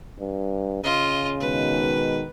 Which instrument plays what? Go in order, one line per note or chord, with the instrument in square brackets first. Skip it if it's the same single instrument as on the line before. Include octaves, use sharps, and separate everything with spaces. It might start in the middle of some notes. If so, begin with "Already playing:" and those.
[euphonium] G2
[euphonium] C#3 [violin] F4 D#5
[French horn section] B2 D#3 G#3 [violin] B4